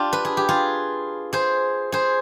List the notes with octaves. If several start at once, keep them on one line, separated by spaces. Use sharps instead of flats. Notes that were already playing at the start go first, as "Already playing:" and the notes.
Already playing: D4 F4 G4
B4
G#4
G4
F4 G#4
G#4 C5
G#4 C5